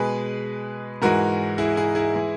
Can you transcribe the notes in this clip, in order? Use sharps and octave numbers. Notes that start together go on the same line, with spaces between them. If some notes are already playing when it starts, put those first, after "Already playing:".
Already playing: B2 G#3 G#4 B4
G#2 E3 G#3 F#4 A#4
E4 G#4
E4 G#4
E4 G#4
E3 G#3